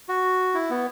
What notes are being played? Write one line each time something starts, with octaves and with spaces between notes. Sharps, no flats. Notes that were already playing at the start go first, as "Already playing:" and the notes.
F#4
E4
B3